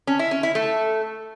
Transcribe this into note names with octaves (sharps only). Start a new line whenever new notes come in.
C#4
E4
C#4
E4
A3